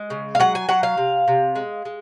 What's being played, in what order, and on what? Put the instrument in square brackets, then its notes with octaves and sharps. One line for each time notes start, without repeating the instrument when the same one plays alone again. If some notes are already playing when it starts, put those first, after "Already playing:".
Already playing: [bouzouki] G#3
C#3
F5
F#3 F#5
G#5
F#3 F#5
F5
C3
C3
G#3
G#3